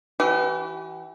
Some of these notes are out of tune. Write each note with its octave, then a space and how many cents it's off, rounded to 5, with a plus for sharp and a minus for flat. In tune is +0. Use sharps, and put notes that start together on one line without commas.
E3 +0 G4 -45